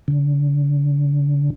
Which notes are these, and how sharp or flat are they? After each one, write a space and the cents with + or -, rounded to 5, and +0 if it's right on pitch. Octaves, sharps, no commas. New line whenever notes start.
D3 -40